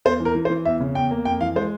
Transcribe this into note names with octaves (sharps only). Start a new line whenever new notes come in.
E2 C5
E3
A#4
E3
C5
E3
E2 E5
C#3
E2 G5
A#3
F2 G5
E3 F5
G#3 C5